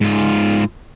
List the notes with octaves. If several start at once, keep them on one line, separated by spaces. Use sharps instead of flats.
G#2 F4